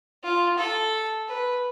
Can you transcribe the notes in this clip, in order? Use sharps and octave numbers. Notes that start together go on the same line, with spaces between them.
F4
A4
B4